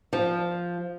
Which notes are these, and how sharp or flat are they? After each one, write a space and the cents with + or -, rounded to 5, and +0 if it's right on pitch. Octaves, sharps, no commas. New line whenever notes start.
F3 +0